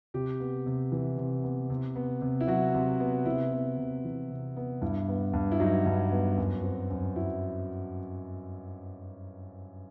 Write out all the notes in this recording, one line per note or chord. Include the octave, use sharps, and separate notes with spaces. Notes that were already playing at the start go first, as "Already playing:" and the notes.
C3 G4
B3
C3
E3
C3
B3
C3
B3
C3
E4
F#3 F#4
C3
B3
C3 E4
B3
C3
E3
C3
B3
G2 E4
B3
G2
E4
F#3 D#4
G2
B3
F#2
C4
F#2
F#3 E4